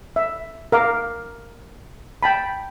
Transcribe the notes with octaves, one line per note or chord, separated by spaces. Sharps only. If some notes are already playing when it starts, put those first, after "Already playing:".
E5
A#4 F5 D6
G5 A5 B5